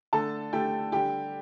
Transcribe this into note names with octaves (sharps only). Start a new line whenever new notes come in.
D3 A3 A4 A5
D3 A3 G4 G5
D3 G3 G4 G5